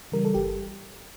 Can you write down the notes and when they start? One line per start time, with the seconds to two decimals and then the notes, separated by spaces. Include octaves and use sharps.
0.12 C#3 E3 G3 A#4
0.25 A4
0.34 G1 G4